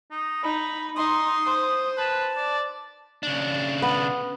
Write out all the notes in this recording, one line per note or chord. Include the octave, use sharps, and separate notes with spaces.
D#4
D#4 B5
D#4 C6 D#6
C5
B4 A5
D5
C#3 D4
B3